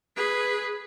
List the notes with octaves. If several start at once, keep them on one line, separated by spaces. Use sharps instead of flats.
G#4 B4